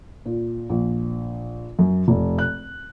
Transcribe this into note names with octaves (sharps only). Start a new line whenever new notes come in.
A#2
A#1
F#2
F1
F#6